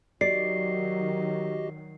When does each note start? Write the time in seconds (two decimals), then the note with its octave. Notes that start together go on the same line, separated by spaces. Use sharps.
0.21 D#3 F#3 F#4 G4 D5 D#5 C7